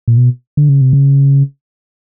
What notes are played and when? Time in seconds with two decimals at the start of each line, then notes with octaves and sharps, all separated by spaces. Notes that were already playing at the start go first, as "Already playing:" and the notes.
0.08 A#2
0.17 B2
0.57 D3
0.69 C#3
0.81 C3
0.93 C#3